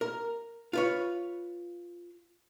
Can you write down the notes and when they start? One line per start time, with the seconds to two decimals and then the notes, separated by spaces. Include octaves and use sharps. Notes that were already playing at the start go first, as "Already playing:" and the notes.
0.01 A#4
0.73 F4 B4 C#5